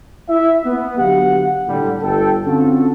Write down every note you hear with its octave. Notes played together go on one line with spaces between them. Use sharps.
E4 E5
B3
D3 F#3 G4 F5 F#5
A2 D3 G3
G1 A4 G5
D3 C4 C#4 F4 F#4 A4